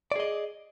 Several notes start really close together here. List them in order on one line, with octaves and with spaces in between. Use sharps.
D5 G#4 D#5